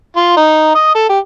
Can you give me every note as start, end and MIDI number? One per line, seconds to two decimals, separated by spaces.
0.16 0.33 65
0.36 0.72 63
0.74 0.92 75
0.94 1.08 69
1.09 1.18 67